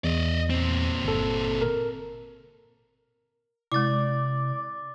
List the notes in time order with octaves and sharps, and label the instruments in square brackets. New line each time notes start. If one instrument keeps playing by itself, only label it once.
[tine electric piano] E2 [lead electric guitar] D5 D#5
[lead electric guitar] A#2 C4
[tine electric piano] G1 A4
A#4
[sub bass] C3 [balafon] G#3 E4 [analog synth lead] D5 [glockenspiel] D6 A6